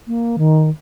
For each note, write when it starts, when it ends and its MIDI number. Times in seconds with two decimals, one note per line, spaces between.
0.07 0.36 58
0.38 0.69 51